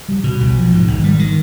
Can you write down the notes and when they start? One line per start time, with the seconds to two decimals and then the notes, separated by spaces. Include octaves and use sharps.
0.09 G3
0.24 B2
0.40 B1
0.56 F3
0.72 G#2
0.88 G#1
1.04 G3
1.19 D#3